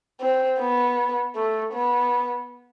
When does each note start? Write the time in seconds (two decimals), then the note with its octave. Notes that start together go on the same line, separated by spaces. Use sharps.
0.21 C4
0.59 B3
1.36 A3
1.73 B3